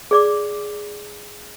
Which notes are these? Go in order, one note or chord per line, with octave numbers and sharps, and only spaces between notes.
G#4 D5 D6